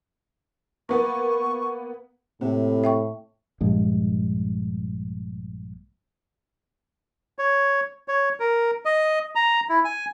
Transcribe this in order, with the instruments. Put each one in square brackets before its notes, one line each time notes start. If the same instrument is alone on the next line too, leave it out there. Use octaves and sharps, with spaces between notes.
[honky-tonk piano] A#3 B3 [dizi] C#6
[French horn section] A2 [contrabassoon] C3 [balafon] A#3
[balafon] E5 G5 C#6
[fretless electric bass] A#1 G2 G#3
[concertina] C#5
C#5
A#4
D#5
A#5
E4
G#5